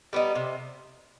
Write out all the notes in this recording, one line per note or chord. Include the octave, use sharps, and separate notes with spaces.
G3 B3 D#4
C3